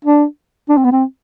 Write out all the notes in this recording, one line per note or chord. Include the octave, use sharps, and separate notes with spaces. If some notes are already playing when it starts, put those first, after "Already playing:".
D4
D4
C4
B3
C4